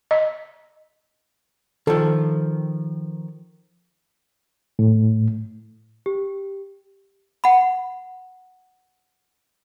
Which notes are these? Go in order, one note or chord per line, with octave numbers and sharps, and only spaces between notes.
D#5
D#3 F3 A4
A2
G4
F#5 B5